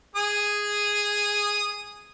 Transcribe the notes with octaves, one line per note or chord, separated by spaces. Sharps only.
G#4 D#6